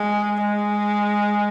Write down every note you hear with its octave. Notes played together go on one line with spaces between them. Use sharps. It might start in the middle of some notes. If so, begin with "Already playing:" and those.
Already playing: G#3
G#3